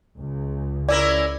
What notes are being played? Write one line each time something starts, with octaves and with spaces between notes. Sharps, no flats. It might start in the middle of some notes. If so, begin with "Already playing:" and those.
C#2
C#4 E4 A#4 D5